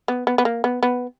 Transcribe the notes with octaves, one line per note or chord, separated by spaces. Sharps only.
B3
B3
B3
A#3
B3
B3